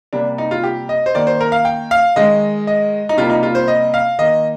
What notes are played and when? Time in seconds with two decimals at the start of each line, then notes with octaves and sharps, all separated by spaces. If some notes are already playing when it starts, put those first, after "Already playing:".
0.13 C3 G3 A#3 D4
0.38 D#4
0.51 F4
0.64 G4
0.89 D#5
1.06 C5
1.15 D#3 A#3 D5
1.27 C5
1.41 A#4
1.52 F5
1.65 G5
1.91 F5
2.16 D#3 G#3 D#5
2.67 D#5
3.09 D#4
3.17 C3 G3 A#3 F4
3.30 D#4
3.43 F4
3.55 C5
3.68 D#5
3.94 F5
4.19 D#3 A#3 D#5